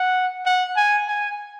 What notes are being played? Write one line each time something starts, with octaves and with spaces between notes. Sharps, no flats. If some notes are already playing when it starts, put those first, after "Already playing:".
Already playing: F#5
F#5
G#5
G#5